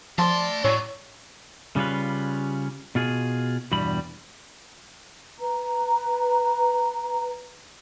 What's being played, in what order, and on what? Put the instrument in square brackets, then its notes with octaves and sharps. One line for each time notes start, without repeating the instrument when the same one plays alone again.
[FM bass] F3 [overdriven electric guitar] A3 C6 [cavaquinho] D5 A5
[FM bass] A2 [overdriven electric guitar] F#3 [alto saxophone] C#5
[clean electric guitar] C#3 G3 C#4 F4 B4
B2 F4 G#4
E2 G2 B2 G3 B5
[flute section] B4 A#5